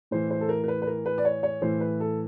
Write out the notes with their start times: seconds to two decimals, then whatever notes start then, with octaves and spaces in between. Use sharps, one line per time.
0.11 A2 E3 C5
0.31 C5
0.41 A4
0.49 A#4
0.64 A#4
0.68 B4
0.82 B4
0.87 A#4
1.06 B4
1.18 D5
1.25 C#5
1.43 C#5
1.62 A2 E3 C5
1.80 B4
2.00 A4